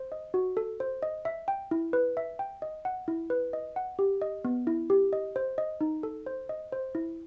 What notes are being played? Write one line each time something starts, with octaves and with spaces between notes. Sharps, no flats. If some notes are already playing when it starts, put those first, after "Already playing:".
Already playing: C5
D#5
F#4
A4
C5
D#5
E5
G5
E4
B4
E5
G5
D#5
F#5
E4
B4
D#5
F#5
G4
D#5
B3
E4
G4
D#5
C5
D#5
D#4
A4
C5
D#5
C5
E4